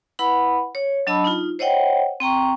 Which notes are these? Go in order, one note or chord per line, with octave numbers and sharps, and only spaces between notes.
E4 B4 F#5 B5
C#5
F#3 D4 D#5 A5 B5 E6
D#4 F4
C5 C#5 D#5 F#5 G5
C4 G5 A#5 C#6